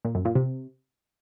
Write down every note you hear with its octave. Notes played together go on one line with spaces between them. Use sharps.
A#2
F#2
A#2
C3